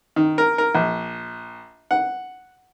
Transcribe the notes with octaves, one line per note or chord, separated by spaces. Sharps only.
D#3
A#4
A#4
A#1
F#5